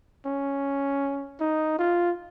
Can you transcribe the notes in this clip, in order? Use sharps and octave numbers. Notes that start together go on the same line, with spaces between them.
C#4
D#4
F4